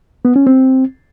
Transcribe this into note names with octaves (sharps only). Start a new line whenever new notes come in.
B3
C#4
C4